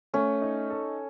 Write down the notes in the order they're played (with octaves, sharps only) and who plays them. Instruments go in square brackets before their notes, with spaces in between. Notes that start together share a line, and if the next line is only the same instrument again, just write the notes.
[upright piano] A3 [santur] C#4
[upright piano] D#4
A4